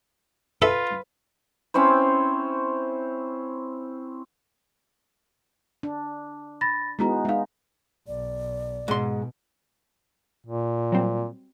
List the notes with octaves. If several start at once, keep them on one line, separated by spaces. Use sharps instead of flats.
F4 A4 B4 E5
C4 C#4 E4 C5
D4
B5 A6 A#6
G#3 B3 D#4 E4 F#4 A#5
G#3 D#4 E5 F5
B1 D5
G#2 B2 C6
A#2
F#3 G3 C4